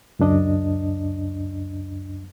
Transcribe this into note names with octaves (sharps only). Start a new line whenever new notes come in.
C#2 F#2 D4 D#5